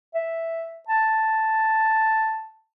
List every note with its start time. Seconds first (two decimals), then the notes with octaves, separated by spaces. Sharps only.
0.15 E5
0.88 A5